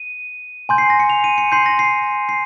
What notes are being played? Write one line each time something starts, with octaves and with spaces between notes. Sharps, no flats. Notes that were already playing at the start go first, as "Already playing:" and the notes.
Already playing: D#7
G#5 C6 G6
C7
A#6
C#7
F7
D#7
C#7
C6 G6 C7
A#6
C7
C7